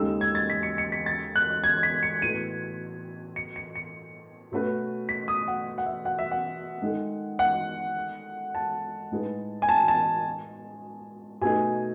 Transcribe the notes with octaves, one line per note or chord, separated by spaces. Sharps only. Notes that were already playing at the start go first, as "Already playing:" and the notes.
Already playing: D#2 C#3 G#3 D#4 A4 E6
G#6
A6
B6
C#7
C#7
B6
A6
F#6
G#6
B6
C#7
A2 E3 B3 F#4 A4 D#7
C#7
C#7
C#7
B2 A3 C#4 F#4 B4
B6
D#6
F#5
F#5
E5
F#5
E5
F#5
D#3 G#3 D#4 A4
F#5
A5
A2 G#3 D#4 G#4 B4
G#5
A5
A5
B2 A3 D#4 G#4 G#5